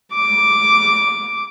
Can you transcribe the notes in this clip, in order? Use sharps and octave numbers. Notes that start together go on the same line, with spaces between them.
D6